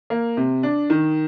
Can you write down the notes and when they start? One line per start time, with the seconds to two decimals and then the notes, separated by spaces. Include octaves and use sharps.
0.10 A#3
0.37 C3
0.63 D4
0.90 D#3